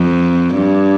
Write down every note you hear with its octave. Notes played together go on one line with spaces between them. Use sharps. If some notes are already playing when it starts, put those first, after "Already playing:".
Already playing: F2
G2